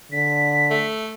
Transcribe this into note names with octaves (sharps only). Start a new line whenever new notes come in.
D3 B6
A3